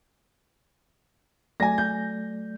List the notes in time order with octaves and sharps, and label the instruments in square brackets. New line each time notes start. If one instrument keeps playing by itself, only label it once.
[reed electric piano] F#3 A3 D5 [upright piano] G#5 A#6
[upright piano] G6